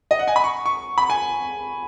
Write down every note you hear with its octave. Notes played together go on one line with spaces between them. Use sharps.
D#5
F#5
G#5
B5
C#6
C#6
B5
G#5